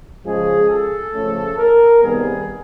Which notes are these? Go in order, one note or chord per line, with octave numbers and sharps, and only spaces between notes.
C#3 F3 G#3 G#4
A4
C#3 F3 A3 C#4
A#4
C3 D#3 G3 B3 G#4